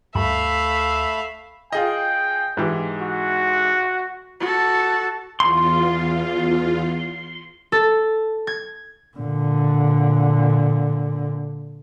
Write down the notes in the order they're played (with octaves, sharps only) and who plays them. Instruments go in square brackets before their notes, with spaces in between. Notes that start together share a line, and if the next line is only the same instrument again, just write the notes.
[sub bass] D2 [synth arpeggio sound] G2 [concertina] A3 B5 [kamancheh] E5 F5
[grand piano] F4 G#4 D#5 [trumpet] G5
[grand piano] G#2 E3 G4
[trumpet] F#4
[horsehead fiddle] F#4 A4
[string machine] E2 F4 [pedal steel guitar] C6
[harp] A4
G#6
[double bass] A#2 D3